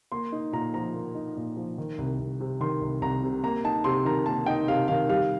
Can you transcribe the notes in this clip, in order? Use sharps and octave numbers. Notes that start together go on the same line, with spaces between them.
A#3 C6
D#4
A#2 A#5
F3 A#5
A#3
D#4
A#2
F3
D#3
C2
C2
C3
D#3 C6
C2
C2 A#5
C3
A#3 A#5
D#4 A5
C3 C6
D#3 A#5
A#3 A5
D#4 G5
C3 F5
D#3 F5
G3 F5